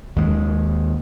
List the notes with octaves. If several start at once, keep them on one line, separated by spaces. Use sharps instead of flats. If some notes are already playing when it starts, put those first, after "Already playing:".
D#2 G#3